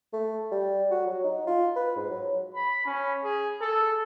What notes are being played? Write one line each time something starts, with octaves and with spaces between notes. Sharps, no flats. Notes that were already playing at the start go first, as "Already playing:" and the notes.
A3
G3
F#4
F#3
D#4
F4
B4
G#2
F#3
B5
C#4
G#4
A4